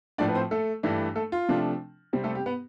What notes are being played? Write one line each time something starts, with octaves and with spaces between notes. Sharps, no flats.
A2 F3 A3 D4 D5
B4
C4 C5
A3 A4
G2 E3 A3 D4
A3 A4
F4
C3 F3 A3 D4
C3 G3 C4 G4
A3 A4
G4
B3 B4